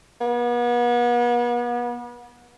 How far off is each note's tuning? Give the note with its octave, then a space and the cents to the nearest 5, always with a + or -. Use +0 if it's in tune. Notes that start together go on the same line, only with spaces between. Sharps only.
B3 -40